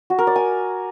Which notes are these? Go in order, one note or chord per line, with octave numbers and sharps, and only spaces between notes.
F#4
A#4
D5
G#5